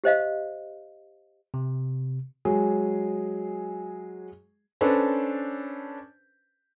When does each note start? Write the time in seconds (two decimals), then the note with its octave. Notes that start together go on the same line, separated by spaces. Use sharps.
0.04 G4 C5 D#5 F5
1.54 C3
2.45 F#3 G#3 G#4
4.81 C#4 D4 A4 B4 C5